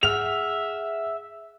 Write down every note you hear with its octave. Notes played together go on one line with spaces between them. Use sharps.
G#4 E5 F#5 F6 F7